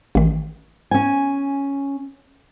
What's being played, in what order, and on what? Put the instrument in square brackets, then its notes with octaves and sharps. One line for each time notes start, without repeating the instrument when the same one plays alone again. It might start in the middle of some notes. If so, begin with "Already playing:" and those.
[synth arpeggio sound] A1 D#3
[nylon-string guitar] C#4 G#5